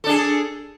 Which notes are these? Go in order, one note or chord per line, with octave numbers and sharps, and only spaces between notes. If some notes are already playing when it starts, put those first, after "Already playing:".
D4 G#4 A4